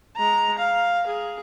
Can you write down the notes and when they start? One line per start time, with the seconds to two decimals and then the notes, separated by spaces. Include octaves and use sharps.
0.17 G#3 A#5
0.58 F5
1.07 G#4